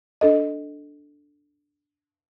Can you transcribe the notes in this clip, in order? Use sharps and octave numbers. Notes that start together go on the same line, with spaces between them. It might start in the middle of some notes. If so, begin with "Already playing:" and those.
D4 A4 D#5